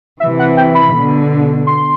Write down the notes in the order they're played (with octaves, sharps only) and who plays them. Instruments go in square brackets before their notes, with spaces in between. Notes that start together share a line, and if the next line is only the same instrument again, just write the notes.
[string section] C3 E3 [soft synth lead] E5
[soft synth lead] F#5
G5
B5
[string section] B2 D3
[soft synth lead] C6